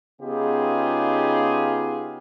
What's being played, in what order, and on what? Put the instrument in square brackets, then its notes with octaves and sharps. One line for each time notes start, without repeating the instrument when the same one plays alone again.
[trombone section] C#3 B3 D#4 F4 G4 G#4